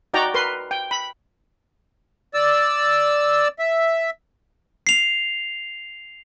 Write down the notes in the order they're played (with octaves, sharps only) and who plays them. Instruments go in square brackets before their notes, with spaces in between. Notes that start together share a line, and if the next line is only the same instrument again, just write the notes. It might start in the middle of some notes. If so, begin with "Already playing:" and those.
[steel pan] D#4 F#4 D5 G5 A#5
A#4 B4 C6
G5
B5
[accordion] D5 E6
E5
[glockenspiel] C7 F7